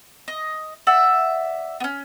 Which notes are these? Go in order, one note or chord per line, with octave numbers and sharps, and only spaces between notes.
D#5
D5 E5 F#5 E6
B3 C#4